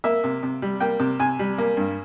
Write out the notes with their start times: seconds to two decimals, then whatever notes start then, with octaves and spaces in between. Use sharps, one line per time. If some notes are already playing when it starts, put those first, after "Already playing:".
0.04 A#3 E5
0.24 C3
0.43 C3
0.62 G3
0.80 A#3 G5
1.00 C3
1.20 C3 G#5
1.39 G3
1.58 A#3
1.77 G2